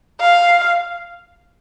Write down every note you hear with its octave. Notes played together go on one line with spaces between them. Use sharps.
F5